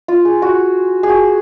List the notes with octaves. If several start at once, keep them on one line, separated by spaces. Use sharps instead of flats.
F4
G#4
F#4
G#4
F#4